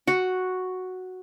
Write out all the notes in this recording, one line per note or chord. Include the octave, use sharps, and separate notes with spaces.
F#4